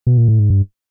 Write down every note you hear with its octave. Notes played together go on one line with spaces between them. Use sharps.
B2
A#2
A2
G#2
G2